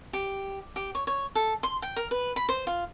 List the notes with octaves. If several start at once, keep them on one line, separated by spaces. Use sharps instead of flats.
G4
G4
C#5
C#5
A4
C6
G5
A#4
B4
B5
C5
F4